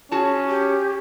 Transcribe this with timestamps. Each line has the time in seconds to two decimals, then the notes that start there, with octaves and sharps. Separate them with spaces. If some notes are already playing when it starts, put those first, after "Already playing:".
0.11 C#4 F#4 G#4 A5
0.49 G4